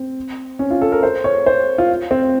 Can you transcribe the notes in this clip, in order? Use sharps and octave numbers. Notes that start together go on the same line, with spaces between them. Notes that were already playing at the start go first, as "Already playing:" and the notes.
Already playing: C4
C#4
F4
A4
A#4
C5
C#5
C5
F4
C4